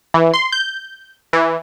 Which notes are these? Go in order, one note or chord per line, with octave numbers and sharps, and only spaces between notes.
E3
C6
G6
E3